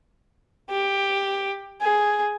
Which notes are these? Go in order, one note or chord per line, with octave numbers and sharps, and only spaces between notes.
G4
G#4